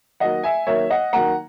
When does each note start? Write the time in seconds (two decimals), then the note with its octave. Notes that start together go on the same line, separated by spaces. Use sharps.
0.20 D#3 F#3 A#3 D#5 F#5
0.44 E5 G#5
0.67 D#3 F#3 A#3 C#5 E5
0.90 D#5 F#5
1.13 D#3 F#3 A#3 F#5 A#5